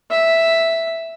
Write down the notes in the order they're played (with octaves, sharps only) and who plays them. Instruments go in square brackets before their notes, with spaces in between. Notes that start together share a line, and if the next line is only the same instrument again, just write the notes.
[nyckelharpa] E5